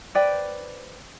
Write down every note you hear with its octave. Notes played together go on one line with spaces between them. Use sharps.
B4 C5 D5 G5